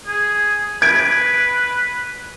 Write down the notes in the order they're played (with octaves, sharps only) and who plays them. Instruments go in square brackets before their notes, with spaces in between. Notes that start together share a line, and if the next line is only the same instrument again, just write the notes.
[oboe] G#4
[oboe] B4 [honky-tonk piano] G#6 D7